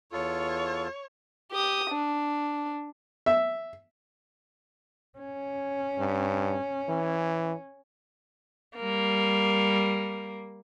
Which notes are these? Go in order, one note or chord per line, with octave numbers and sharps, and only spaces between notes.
E2 F4 A4 C#5
G4 D#6
D4
E5
C#4
G2
E3
G3 A#3